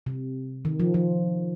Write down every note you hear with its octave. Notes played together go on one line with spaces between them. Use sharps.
C3
D#3
F3
F3